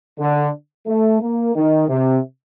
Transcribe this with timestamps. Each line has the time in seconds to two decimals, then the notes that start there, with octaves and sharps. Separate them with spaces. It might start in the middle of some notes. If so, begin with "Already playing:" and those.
0.20 D3
0.87 A3
1.21 A#3
1.56 D#3
1.89 C3